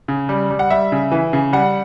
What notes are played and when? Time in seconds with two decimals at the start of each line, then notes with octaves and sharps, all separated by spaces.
0.08 C#3
0.29 G3
0.50 G3
0.59 F#5
0.70 G3 E5
0.92 C#3
1.11 E3
1.33 C#3
1.53 G3 F#5